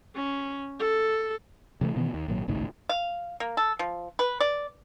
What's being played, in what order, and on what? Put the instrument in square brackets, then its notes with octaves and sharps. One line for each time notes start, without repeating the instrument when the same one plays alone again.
[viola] C#4
A4
[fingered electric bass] C3 E3 G3 A3
B2 D#3 E3 B3
D#2
G#1 A#2 F#3
G#1 C#2 A2 D#3
[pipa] F5
A#3
A4
F3
B4
D5